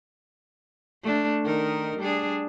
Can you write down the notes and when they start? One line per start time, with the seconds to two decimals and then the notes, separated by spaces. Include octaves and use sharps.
1.03 A3 D4
1.44 D#3 D#4 A#4
1.99 G3 D4 G#4